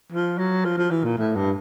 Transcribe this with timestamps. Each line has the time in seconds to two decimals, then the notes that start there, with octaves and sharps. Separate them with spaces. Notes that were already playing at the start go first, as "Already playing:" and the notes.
0.12 F3
0.38 F#3
0.65 F3
0.78 F3
0.91 E3
1.04 A#2
1.18 A2
1.36 G2